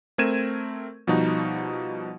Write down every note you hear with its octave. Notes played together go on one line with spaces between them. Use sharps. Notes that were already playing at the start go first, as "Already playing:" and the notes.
A3 C4 A#4 G#6 D#7 E7
B2 F3 G3 D#4 F#4